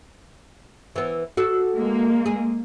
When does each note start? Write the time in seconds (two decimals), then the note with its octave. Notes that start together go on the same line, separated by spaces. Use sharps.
0.96 E3 B3
1.37 F#4 A4
1.76 G#3 A#3
2.26 G#4